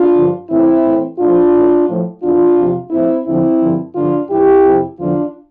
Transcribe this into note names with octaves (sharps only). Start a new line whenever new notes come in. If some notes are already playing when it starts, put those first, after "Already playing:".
Already playing: D4 F4
G2 D3 F3
A2 E3 C4 E4
A2 E3
A2 F3 D4 F4
A2 E3
A2 F3
E2 E3 D4 F4
E2 C3 F3
A2 F3 C4 E4
E2 D3 F3 C4 E4
G2 D3 F3
G2 D3 F3 D4 F4
G2 E3 E4 G4
F2 C3 F3
E2 D3 F3 D4 F4